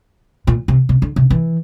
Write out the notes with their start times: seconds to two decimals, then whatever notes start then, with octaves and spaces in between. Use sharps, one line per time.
0.47 A#2
0.68 C3
0.89 C3
1.02 D3
1.16 C3
1.30 E3